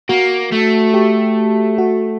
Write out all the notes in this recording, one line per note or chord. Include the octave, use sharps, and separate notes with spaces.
A#3 F#4
A3
G4
F#4